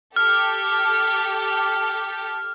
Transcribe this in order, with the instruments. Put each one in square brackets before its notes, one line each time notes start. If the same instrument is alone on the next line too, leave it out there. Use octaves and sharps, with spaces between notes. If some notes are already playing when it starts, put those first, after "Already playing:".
[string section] G4 A4 [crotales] F6